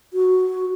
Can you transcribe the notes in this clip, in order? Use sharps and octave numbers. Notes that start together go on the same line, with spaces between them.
F#4